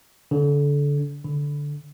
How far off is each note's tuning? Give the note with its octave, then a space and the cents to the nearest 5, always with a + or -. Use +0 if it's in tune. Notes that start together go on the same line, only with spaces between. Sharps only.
D3 -25
D3 -10